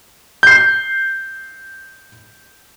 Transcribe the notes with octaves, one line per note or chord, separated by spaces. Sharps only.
G6 C7